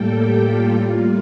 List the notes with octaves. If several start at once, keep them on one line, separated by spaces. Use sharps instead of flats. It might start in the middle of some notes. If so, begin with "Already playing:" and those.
Already playing: A2 G3 A#3 A4 G5
G4
F4
A2 G3 A#3